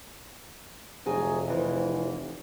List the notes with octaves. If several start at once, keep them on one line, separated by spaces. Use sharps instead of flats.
F1 D2 F#3 G#4
F2 E3